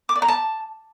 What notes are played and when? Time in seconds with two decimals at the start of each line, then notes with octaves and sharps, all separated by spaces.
0.09 D6
0.16 D5
0.22 A#5
0.28 A5